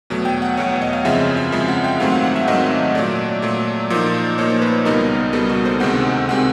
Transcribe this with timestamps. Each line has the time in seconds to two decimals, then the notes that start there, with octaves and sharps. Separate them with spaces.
0.10 E2 B2 F#3 A3
0.25 G5
0.42 F#5
0.57 E2 B2 F#3 A3 C#5
0.82 D#5
0.93 F5
1.05 F#2 C#3 F3 G#3 C4 E5
1.37 E5
1.52 F#2 C#3 F3 G#3 C4 E5
1.68 F#5
1.84 G5
2.00 G#2 D#3 F#3 A3 C4 F5
2.12 F#5
2.24 F#5
2.36 E5
2.48 G#2 D#3 F#3 A3 C4 D#5
2.95 A#2 F#3 A3 D5
3.42 A#2 F#3 A3
3.90 A#2 F3 A#3 D#4
4.38 A#2 F3 A#3 D#4 C#5
4.50 C5
4.62 B4
4.85 C#2 B2 G3 B3 D#4 A#4
5.33 C#2 B2 G3 B3 D#4 A4
5.49 F#4
5.65 C5
5.80 D2 C3 D#3 G#3 C4 F#5
6.29 C3 D#3 G#3 C4 F#5